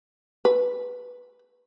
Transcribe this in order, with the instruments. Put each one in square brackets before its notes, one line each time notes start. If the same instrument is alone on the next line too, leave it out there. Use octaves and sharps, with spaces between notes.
[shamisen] B4